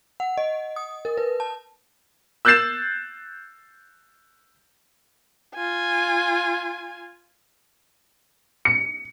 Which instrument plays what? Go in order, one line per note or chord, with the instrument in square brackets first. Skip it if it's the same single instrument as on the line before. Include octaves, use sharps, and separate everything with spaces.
[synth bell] F#5
D#5
D#6
A#4
B4
A5
[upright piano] E6 F#6 G6 A6 C7 E7
[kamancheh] F4 G#5
[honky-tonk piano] C#7